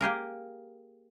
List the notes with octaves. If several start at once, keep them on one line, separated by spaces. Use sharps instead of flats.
A#3 G4 G#4 A#4